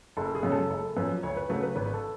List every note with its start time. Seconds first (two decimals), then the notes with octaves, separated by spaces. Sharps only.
0.17 F#1 A4
0.35 G#4
0.43 F#2 C#3 G#3
0.52 A4
0.70 F#1 A4
0.97 F#2 F3 B4
1.23 D2 C#5
1.37 B4
1.49 C#3 F#3 A3 B4
1.63 B4
1.76 G#1 B4
1.94 A4